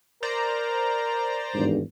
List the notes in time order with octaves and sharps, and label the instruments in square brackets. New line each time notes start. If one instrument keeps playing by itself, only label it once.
[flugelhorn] A#4 [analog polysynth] C5 D5 A#5
[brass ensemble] G#1 E2 G2